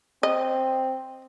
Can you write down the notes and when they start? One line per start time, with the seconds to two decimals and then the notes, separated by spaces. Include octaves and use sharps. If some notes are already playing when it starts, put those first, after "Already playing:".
0.23 C4 D#5